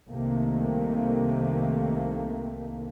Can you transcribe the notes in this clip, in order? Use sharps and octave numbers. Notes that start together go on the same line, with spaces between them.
C2 C3 D#3 A3 A#3